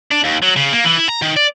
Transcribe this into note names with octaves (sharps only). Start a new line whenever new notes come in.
D4
D#2
F#3
C#3
A#3
E3
E4
A#5
D#3
D5